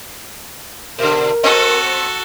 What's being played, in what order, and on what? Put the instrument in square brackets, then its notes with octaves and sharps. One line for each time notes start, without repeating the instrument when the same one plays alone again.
[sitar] B2 D3 [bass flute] A#4
[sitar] B3 C4 D#5 [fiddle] F#4 A4